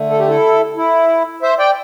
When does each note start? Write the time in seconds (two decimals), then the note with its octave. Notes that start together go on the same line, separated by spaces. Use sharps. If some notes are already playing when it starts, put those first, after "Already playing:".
Already playing: D3 A3
0.10 A4
0.19 G4
0.28 E4 A4
0.76 E4
1.42 C5 E5
1.59 D5 G5